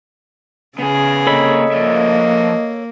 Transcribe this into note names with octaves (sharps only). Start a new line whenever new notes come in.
C#3 B3 G#4 G#5
C3 A#3 A4 C#5 D#5 B5
F3 A#3 D5 E5